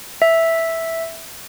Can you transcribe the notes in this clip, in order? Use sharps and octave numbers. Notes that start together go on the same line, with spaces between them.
E5